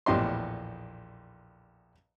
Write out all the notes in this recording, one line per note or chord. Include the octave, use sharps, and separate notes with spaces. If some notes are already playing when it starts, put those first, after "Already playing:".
A#1 E2 A2 G4 D#5 C6